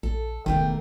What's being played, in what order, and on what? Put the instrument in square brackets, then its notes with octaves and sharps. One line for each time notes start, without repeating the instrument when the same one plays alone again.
[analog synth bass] A#1 [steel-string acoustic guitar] A4
[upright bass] E1 E2 [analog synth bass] D#3 [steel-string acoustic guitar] A3 A#3 A#4 [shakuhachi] G5